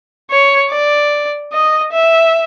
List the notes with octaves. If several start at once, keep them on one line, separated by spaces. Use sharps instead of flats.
C#5
D5
D#5
E5